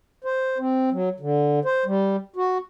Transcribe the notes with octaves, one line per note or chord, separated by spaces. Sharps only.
C5
C4
F#3
D3
C5
G3
F#4